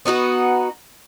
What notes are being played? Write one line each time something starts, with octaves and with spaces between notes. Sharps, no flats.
B3 D#4 F#4 B4